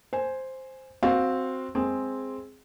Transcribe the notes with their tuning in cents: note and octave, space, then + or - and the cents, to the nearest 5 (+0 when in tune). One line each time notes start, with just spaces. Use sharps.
C5 +0 G#5 +0
C4 +0 F#4 +0 F5 +15
G#3 +5 C4 +0 G#4 +0